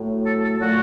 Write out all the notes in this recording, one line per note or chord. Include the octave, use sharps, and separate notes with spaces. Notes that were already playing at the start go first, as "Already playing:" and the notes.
Already playing: A2 F#3 A3
A4
A4
A#2 F#3 A3 F#4